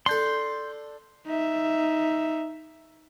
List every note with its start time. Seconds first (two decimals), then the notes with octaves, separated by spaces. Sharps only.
0.06 D4 A4 C6 G6
1.26 D#4 E5